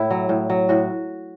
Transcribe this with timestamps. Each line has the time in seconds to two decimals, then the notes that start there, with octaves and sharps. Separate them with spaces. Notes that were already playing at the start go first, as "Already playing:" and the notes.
Already playing: A2 E4
0.11 F#3
0.29 A2
0.50 F#3
0.69 A2 F#4